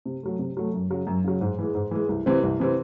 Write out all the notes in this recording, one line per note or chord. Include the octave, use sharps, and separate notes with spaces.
C3
F#3 A3
C3
F#3 A3
F#2
C#3 F#3
F#2
C#3 F#3
G#2
E3 G#3
G#2
E3 G#3
C2
C3 E3 C4
C2
C3 E3 C4